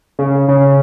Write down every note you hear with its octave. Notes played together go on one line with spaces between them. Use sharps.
C#3
C#3